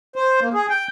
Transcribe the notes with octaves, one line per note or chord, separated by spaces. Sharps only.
C5
A#3
G#4
G5